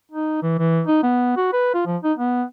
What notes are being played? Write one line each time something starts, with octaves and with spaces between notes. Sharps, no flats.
D#4
E3
E3
D#4
B3
F#4
B4
F4
F3
D#4
B3